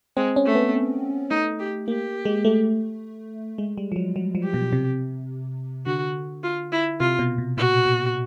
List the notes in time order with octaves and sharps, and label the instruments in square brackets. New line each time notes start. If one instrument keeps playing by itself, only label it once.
[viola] G#3 [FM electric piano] C4
[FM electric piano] C#4
[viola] A3
[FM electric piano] B3
[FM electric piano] A3 [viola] D#4
[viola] G4
[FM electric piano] A#3 [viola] G4
[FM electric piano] G#3
A3
G#3
G3
F3
F#3
F#3
F3
[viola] G4
[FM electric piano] B2
C3
[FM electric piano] D3 [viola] F#4
[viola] F4
E4
[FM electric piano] C3 [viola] F4
[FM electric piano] B2
B2
[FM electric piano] A#2 [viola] F#4
[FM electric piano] B2